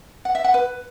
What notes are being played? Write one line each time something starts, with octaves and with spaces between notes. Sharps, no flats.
F#5
E5
F#5
B4